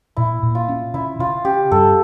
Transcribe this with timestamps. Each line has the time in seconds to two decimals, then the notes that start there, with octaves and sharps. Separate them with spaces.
0.16 A#2 E4
0.43 A#2
0.55 F4
0.69 C#4
0.94 C#3 E4
1.19 C#3 F4
1.45 C#4 G4
1.71 G2 A4